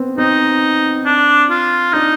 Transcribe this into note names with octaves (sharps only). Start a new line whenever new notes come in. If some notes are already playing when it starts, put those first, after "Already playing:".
Already playing: B3 C4
C4 D#4
D4
F4
D4 D#4